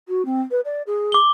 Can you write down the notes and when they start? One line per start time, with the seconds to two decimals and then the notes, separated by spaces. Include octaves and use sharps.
0.08 F#4
0.25 C4
0.51 B4
0.65 D5
0.87 G#4
1.12 D6 G7